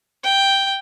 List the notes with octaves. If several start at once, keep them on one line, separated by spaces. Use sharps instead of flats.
G5